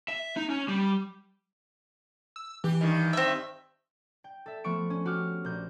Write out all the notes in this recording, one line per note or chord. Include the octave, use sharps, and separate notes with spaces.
E5
D#4
C#4
G3
E6
E3 G4
G2 D#3
C4 E5
G5
A4 E5
F3 A3 B3 C#6 D7
C#4
F#4 G4 D6 F6
A#1 G6